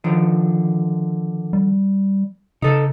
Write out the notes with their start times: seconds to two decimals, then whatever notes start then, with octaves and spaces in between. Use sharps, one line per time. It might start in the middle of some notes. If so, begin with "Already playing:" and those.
0.04 D3 D#3 F3
1.53 G3
2.62 C#3 D#4 A4